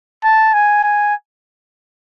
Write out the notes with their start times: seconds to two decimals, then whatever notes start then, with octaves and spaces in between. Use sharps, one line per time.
0.24 A5
0.54 G#5
0.84 G#5